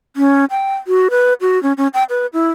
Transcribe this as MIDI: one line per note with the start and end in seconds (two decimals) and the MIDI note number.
0.17 0.45 61
0.50 0.75 79
0.87 1.08 66
1.10 1.33 71
1.41 1.61 66
1.63 1.73 61
1.77 1.88 61
1.94 2.04 79
2.10 2.26 71
2.33 2.50 64